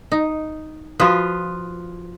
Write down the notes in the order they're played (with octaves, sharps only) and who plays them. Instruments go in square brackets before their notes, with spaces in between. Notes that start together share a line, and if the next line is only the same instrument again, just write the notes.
[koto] D#4
[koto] F3 [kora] F4 B4 [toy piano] F#4 F5 D#6